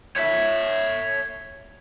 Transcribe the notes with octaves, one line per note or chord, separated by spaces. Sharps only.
C#5 E5